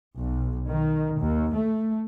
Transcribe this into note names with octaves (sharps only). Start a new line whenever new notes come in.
B1
D#3
D#2
A3